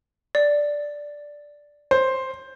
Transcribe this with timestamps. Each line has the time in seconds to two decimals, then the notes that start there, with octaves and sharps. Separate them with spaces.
0.35 D5
1.91 C5